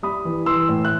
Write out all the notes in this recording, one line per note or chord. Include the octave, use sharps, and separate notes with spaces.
G3 B5 D#6
E3
E3 C6 E6
A2
F#6